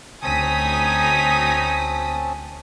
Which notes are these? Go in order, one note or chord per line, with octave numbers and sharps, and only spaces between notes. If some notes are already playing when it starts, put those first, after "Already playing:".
D2 C4 C#4 D#4 G#5 A5 D#6 B6